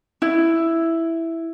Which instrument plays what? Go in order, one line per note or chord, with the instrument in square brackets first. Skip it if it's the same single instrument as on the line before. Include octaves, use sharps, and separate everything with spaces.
[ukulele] E4